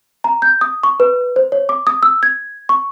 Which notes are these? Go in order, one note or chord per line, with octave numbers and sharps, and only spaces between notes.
A#5
G6
D#6
C#6
B4
C5
C#5
D6
D#6
E6
G#6
C#6